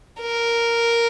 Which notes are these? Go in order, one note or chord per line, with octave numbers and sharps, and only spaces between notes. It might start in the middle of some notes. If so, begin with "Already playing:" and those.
A#4